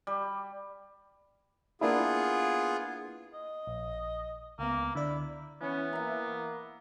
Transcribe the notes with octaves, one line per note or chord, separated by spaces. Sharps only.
G3
A#3 B3 D4 E4 F4 G#4
D#5
A#1
C#2 A#3 B3
D3 E4 D5
E3 B3 C#4
A#3 E5 A#5